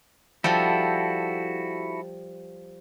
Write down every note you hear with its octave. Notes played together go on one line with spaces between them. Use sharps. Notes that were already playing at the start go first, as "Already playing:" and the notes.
F3 G3 E4 F#4 A4